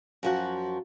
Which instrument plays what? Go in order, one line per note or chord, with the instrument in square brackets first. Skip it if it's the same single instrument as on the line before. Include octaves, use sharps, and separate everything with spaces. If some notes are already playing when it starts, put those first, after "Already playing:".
[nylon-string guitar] F#2 F3 F#4